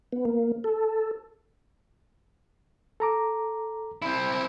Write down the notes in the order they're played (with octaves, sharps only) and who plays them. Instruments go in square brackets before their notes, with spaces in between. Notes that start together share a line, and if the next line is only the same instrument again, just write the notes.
[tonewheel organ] B3
A#3
A4
[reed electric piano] A4 A#5 D6
[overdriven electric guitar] C4 E4